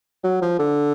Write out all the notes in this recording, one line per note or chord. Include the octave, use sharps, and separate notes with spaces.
F#3
F3
D3